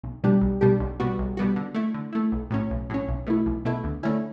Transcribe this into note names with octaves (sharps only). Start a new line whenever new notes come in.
B1
B2 G3 D4 G4
B1
B2 G3 D4 G4
B1
B2 G3 B3 F#4
B1
B2 G3 B3 F#4
D3
A3 E4
D3
A3 E4
B1
A2 F#3 C#4
B1
A2 F#3 C#4
B1
B2 A3 E4
B1
B2 A3 E4
D2
D3 A3 C#4 E4